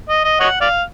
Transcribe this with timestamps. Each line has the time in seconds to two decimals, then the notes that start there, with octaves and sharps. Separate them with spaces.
0.09 D#5
0.25 D#5
0.40 C#5 D#5 F#5
0.61 D5 F5